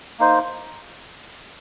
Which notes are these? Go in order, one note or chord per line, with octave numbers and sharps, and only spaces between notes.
A#3 D#4 C5